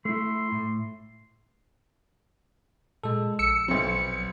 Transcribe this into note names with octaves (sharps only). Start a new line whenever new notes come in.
A3 E4 C6
A2
A#2 G#3 A4
A#1 E6 C#7
B1 F#3 C4